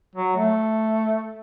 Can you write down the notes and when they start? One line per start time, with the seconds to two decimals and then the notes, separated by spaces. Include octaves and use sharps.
0.15 F#3
0.37 A3